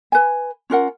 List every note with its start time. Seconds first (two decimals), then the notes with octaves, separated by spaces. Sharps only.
0.12 B4 G#5
0.70 C#4 F4 A#4 F#5